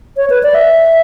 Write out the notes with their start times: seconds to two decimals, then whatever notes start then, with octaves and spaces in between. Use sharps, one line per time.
0.17 C#5
0.30 B4
0.43 D5
0.55 E5